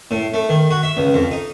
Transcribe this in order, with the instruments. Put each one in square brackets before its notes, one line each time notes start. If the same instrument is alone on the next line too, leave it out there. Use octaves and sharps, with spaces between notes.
[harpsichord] A2
A3
D#3
F#4
E5
C#2
F2
D#4